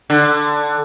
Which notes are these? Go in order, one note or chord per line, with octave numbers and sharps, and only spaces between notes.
D3